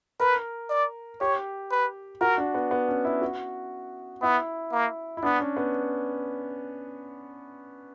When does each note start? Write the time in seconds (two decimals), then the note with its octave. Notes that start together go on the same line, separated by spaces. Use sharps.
0.20 A#4 B4
0.70 D5
1.21 G4 C#5
1.71 B4
2.21 F#4 A#4
2.38 D4
2.54 B3
2.71 B3
2.89 C#4
3.05 E4
3.22 F#4
4.22 B3 E4
4.72 A#3
5.17 E4
5.23 B3 D4
5.40 C#4
5.57 B3